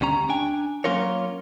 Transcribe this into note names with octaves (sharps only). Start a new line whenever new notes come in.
D2 G3 C#4 A#5
D4 G5 G#5
F#3 A#3 C#4 F4 A#4 C#5